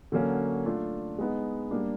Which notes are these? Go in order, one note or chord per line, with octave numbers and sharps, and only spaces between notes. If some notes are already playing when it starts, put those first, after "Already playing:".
D3 F#3 A#3 C#4
A3 D4 F4
G#3 B3 D#4
G3 A#3 D4